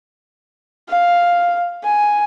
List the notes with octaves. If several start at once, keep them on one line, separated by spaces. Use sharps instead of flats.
F5
G#5